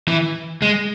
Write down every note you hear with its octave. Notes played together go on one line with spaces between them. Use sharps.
E3
G#3